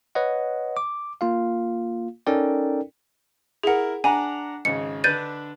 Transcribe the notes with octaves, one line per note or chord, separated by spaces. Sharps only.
B4 C#5 D#5 F#5
D6
A#3 F4 F5
C#4 D#4 A4 A#4 D5 G5
E4 G#4 A#4 F#5
D4 F#5 G#5 A#5
G#1 C#3 C#7
D3 D4 B4 G6 A6 D#7